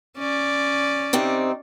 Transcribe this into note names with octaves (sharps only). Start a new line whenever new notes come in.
C#4 D5
C3 C4 D#4